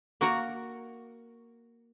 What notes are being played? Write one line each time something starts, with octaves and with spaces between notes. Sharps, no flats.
A#3 F#4 A#4 F#5